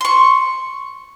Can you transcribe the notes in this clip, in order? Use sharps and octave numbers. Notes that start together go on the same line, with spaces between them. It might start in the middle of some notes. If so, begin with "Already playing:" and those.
C6 C#6